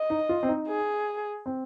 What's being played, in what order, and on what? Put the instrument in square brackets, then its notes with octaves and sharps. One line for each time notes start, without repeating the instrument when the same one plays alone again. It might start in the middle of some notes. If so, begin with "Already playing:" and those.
Already playing: [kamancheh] D#5
[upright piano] D#4
F4
C4
D#4
[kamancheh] G#4
[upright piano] C4